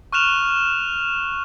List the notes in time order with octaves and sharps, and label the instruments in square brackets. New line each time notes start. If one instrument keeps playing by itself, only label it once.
[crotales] C#6 F6 F#6 E7 F7